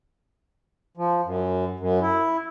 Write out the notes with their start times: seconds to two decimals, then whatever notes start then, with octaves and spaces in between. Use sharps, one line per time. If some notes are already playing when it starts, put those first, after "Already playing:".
0.97 F3
1.25 F#2
1.80 F#2
2.02 E4